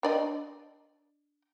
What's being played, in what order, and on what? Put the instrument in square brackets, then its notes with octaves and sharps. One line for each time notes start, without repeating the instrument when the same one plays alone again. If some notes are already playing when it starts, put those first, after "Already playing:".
[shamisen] D4 D5 D#5